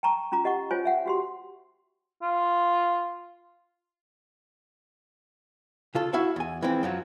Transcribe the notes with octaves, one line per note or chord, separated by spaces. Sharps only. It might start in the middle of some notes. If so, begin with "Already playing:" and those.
G5 A5 A#5 C#6 D6
C#4 F4 A#5 D6
G4 D#5 F#5 C#6
F4 C5 C#5 G#5
E5 F#5 G5
F#4 G4 C6
F4
C#3 F4 A4
E4 F#4 E5 F5
E2 G#5
E3 F3 G#3 C4
F#2 F3 F#3